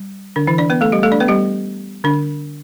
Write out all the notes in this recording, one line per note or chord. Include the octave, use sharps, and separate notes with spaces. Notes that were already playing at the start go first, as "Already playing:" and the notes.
Already playing: G3
D3 D4
E3 E4
D4 D5
B3 B4
A3 A4
G3 G4
A3 A4
D4 D5
B3 B4
G3 G4
D3 D4